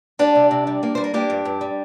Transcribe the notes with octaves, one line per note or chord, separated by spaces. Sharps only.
G3 D4 G4
C3
C3
G3
A#3
G3 C5
A#4
A#3 D4 G4
G2
G2
G3